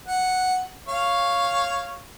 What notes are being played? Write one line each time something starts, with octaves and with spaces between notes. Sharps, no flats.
F#5
C#5 F5